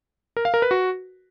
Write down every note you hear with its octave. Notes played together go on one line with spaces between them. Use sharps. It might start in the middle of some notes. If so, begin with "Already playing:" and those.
A#4
F5
A#4
B4
F#4